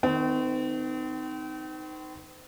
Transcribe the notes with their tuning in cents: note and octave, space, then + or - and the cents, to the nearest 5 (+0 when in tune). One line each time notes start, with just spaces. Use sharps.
D#3 +0 C4 -40